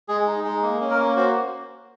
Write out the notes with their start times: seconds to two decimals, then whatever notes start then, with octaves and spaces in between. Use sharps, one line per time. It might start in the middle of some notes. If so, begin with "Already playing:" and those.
0.08 G#3 G#4
0.27 D#4
0.44 G#3
0.62 A#3
0.81 C#4
0.90 A#4
0.98 A#3
1.16 F#4 C5